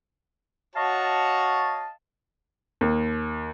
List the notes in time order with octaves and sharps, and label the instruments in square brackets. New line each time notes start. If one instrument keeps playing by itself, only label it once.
[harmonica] F#4 C#5 [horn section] D#5 F5 A5
[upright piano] D#2